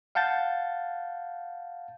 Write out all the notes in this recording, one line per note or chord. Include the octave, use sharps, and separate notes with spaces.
F5 F#5 A5 G6 A6